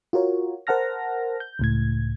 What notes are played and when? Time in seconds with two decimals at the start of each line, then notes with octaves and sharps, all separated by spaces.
0.13 F4 F#4 A#4 C#5
0.67 A#4 C5 F#5 A5 F6 A#6
1.40 G6
1.59 C#2 A2 G#6